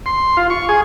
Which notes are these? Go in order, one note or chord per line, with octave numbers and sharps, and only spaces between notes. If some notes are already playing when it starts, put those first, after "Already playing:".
C6
F4
C#6
G#4